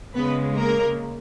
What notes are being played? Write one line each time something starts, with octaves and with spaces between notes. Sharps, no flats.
C#3 G#3 B3 B4
A#3 A#4